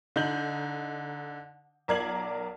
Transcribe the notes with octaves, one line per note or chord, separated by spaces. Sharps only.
D3 D#4 G6 F#7
B1 A#4 D5 G#6 C7 F#7